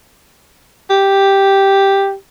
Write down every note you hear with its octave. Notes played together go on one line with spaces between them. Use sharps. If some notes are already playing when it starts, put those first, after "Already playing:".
G4